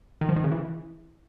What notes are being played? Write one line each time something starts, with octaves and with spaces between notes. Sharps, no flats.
D#3
F3
D#3
C#3
E3